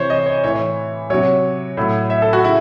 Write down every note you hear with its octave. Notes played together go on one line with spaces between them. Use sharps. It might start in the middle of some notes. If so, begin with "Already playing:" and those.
Already playing: C3 E3 C5 C#5
D#5
C#5
A2 E3 C#5
C3 F#3 C#5
A2 F#3
E5
A4
F#4
C#3 E4